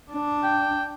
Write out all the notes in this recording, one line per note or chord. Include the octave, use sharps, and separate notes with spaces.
D4
G5